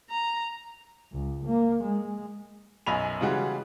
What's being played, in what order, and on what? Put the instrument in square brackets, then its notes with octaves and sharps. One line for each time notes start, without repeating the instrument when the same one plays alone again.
[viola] A#5
[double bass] C#2
A#3
G#3
[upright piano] B1 F#2 D#5 G#5 B5 F7
C#3 E3 G3 G#3 F#4